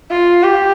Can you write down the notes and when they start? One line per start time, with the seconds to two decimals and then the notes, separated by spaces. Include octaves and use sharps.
0.11 F4
0.43 G4